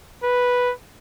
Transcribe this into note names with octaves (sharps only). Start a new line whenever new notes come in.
B4